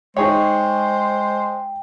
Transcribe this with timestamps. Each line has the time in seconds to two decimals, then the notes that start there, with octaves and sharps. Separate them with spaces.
0.17 G#3 D#4 G#4 C5 C#5 G5